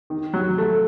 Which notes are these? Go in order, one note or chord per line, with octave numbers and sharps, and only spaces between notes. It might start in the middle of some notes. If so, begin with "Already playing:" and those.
D#3
F#3
A3